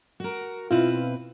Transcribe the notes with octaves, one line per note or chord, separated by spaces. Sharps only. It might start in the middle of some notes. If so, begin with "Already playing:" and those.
F#4 A#4
B2 C4 E4 F4 B4